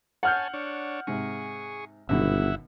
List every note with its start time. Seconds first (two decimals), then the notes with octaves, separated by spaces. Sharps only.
0.23 C#5 F#5 G#5 A5 F6 G6
0.53 D4 C#5
1.07 G#2 C3 G#4 C#6
2.09 G1 F#2 B2 D#3 E4 E5 F#5